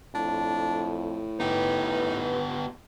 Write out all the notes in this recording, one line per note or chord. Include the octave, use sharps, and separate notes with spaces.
F2 A2 D4
B3 D#4 G4 B4